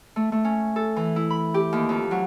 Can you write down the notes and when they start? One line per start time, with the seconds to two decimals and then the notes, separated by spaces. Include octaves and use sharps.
0.16 A3
0.32 A3
0.45 C#4
0.76 A4
0.96 E3
1.16 E4
1.30 B5
1.54 G4
1.73 D#2
1.89 F2
2.11 F#3